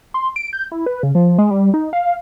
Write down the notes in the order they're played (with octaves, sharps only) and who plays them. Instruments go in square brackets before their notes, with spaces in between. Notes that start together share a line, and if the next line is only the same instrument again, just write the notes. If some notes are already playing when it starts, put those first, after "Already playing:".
[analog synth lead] C6
D7
G6
E4
B4
C#3
F3
G#3
G3
D#4
F5